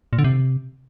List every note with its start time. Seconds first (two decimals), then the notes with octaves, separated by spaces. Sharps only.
0.13 A#2
0.19 D3
0.24 C3